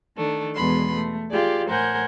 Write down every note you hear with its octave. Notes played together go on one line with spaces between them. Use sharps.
D#3 A3 D4
E2 B2 G#3 B3 B5 C6
A3
F4 G4 G#4 D5
A2 A#4 C5 F#5 G#5 G6